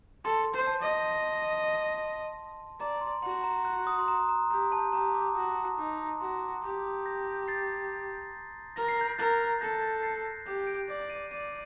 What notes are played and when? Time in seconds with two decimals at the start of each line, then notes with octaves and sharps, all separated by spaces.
0.25 A4 C6
0.54 C5
0.67 A5
0.82 D#5
2.80 D5 A#5
3.01 C6
3.23 F#4 C6
3.44 A#5
3.65 F#6
3.87 D#6
3.99 C6
4.08 A#5
4.29 A#5
4.51 G4 A#5
4.72 A5
4.93 G4 A#5
5.14 D6
5.35 F#4 D#6
5.78 D#4 D6
6.21 F#4 C6
6.42 D6
6.63 G4 D6
6.84 D#6
7.05 G6 A#6
7.48 A6 C7
8.76 A#4 A#6
8.89 C7
9.01 G6 A#6
9.18 A#4 F#6 A6
9.61 A4 G6 A#6
9.82 G6 A#6
10.03 A6 C7
10.25 G6 A#6
10.46 G4
10.67 A#6 D7
10.88 D5 A#6 D7
11.10 C7 D#7
11.31 D5 C7 D#7